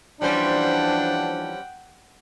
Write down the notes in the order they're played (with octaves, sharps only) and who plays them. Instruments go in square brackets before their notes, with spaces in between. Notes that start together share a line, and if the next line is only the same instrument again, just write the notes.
[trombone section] E3 F3 D4 [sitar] G3 C#4 C5 [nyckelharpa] F#5 G5